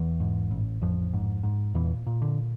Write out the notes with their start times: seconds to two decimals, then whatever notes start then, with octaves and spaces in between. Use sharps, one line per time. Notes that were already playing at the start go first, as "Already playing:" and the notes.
Already playing: E2 E3
0.20 G#2
0.51 A1
0.82 A1 F2 F3
1.13 G#2
1.43 G#2
1.75 E2 A#2 E3
2.07 A#2
2.22 D3